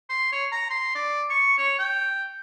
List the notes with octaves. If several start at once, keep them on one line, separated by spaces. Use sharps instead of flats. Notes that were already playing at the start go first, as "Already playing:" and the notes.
C6
C#5
A#5
C6
D5
C#6
C#5
G5